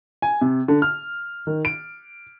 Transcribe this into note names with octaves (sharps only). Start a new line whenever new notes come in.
G#5
C3
D3
F6
D#3
D7